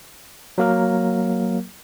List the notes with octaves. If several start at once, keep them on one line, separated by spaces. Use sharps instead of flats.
F#3 A#3 A#4